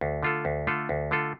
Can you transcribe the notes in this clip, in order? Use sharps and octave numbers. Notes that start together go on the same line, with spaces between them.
D2
D3 A3 F4 A4
D2
D3 A3 F4 A4
D2
D3 A3 F4 A4